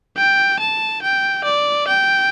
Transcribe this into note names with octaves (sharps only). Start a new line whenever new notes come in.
G5
A5
G5
D5
G5